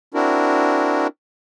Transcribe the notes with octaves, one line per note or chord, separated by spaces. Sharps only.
C4 D4 E4 F#4 A#4